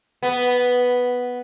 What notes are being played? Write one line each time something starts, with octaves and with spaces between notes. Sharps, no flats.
B3